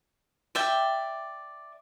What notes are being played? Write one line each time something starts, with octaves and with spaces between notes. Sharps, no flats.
D5 E5 G5